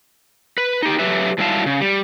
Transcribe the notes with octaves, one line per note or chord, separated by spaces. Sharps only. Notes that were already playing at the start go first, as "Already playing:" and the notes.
B4
D#4 G4
F#3 A3 G4 B4 E5
G#2 F#3 G3 E4 F5 A5
C#3
G3